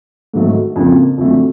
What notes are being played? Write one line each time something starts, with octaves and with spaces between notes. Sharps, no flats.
G#2 D#3 F#3 A3
F2 C#3 F3 A#3
F2 D3 F#3 A3